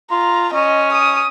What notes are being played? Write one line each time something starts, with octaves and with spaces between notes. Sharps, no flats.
F4 A#5
C#4 D#5
D#6